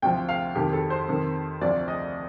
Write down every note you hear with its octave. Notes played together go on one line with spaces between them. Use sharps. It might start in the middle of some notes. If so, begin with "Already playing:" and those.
D2 C3 F3 G5
F5
F2 D#3 G4
A4
C5
F2 D#3
D2 C3 F3 D5
D#5